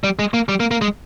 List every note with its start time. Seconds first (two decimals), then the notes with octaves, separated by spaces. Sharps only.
0.04 G3
0.19 G#3
0.34 A#3
0.49 G3
0.60 A#3
0.71 A#3
0.81 G#3